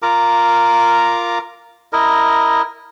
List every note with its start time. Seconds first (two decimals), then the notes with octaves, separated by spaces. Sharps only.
0.02 F4 A#4 A#5 D6
1.93 E4 A#4 D#5